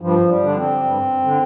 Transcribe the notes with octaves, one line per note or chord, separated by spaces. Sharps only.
G2 F3
G3
D3 D4
C4
G2
D3